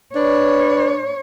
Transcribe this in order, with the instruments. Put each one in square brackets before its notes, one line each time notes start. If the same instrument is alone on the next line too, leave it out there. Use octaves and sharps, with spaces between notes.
[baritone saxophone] D4 [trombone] B4 [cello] C#5